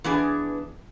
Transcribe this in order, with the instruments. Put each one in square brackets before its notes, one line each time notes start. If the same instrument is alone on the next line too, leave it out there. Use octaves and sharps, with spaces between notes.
[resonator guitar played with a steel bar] E3 B3 D4 G#4